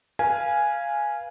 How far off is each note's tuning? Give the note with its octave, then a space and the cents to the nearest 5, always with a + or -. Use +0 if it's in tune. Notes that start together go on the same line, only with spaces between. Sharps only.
B4 -35 F5 -10 G#5 +0